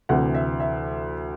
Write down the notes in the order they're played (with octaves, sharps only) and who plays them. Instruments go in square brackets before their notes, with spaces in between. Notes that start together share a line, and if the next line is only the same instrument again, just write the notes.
[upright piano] D2 C3 E3 F#5
E5
E5